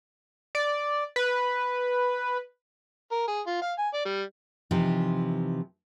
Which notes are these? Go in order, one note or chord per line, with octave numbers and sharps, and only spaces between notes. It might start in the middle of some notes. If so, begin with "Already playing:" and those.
D5
B4
A#4
G#4
F4
F5
G#5
D5
G3
C3 E3 F3 D#4